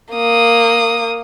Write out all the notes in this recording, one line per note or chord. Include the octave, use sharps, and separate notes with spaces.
A#3 D#6